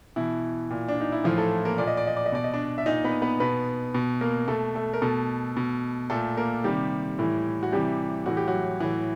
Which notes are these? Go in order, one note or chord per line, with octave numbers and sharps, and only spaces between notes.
B2 E3 E4
A#2
D4
D#4
E4
A2 E3 F3 F4
A3 A4
A#3 A#4
A#2 D5
D#5
D5
D#5
D5
D#5
B2 D5
D#5
D4 D5
E5
A#2 D#4 D#5
B3 B4
B3 B4
B2 B3 B4
B2
A#3 A#4
B2 A3 A4
A3 A4
A#4
B2 A3 A4
B2
A#2 A3 A4
A#3 A#4
C3 D#3 G3 G4
A2 E3
F#4
C3 E3 G3 G4
A2 E3 F#4
G4
F#3 F#4
A2 E3